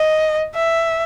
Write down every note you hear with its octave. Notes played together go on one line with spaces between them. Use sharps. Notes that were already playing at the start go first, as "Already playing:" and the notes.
Already playing: D#5
E5